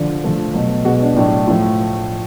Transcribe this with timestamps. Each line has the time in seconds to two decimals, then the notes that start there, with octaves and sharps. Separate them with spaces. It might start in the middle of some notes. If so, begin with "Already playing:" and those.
Already playing: D3 F3
0.24 D3 F3 A3
0.54 B2 F#3 A3
0.85 B2 G#3 B3 F#4
1.02 D4
1.16 A2 F#3 A3 D4
1.47 A2 F3 A3